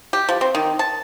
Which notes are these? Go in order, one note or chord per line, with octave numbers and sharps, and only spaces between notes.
G4
F3
C4
D#3
A5